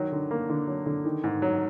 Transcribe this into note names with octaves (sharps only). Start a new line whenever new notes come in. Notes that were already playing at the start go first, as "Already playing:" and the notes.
Already playing: D#3 F#3
D3
A#3
D3
F#3
D3
D#3
G#2
F#3